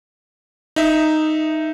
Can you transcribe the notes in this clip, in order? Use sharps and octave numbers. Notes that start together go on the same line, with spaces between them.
D#4 E5